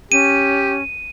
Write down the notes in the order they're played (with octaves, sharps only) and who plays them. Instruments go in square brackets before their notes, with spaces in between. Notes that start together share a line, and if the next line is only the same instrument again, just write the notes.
[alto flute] C#4 [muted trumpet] G4 [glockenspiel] D#7